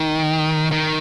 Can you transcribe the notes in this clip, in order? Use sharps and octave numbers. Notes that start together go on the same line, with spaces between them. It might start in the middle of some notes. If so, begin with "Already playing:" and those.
Already playing: D#3
D#3